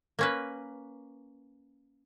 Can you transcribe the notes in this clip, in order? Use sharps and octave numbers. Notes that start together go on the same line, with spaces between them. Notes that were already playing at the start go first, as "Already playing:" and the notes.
A#3 C#4 B4